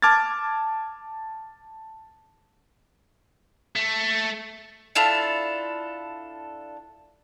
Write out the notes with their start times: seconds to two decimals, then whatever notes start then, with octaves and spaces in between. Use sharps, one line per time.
0.02 A5 D6 F6 G#6 A6
3.76 A3
4.95 D4 E4 F4 A4